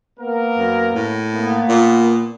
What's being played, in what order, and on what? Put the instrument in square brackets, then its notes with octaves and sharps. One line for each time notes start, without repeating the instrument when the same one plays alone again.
[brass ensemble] A#3 B3 A#4
[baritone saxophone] F#2
A2
[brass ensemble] A#3 B3
[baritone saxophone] A#2